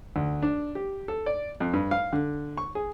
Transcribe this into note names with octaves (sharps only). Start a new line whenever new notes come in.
D2
D4
G4
A4
D5
F2
G2
F5
D3
C#6
G#4